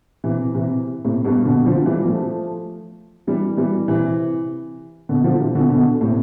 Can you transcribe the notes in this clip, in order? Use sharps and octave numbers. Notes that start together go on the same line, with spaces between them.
C3 E3
C3 E3
A2 C3
G2 B2
B2 D3
D3 F3
E3 G3
F3 A3
E3 G3
E3 G3
C3 E3
B2 D3
D3 F3
C3 E3
B2 D3
B2 D3
A2 C3